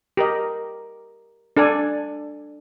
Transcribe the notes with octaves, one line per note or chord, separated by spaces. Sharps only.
G4 A#4 D#5
D4 A4 D5 G#5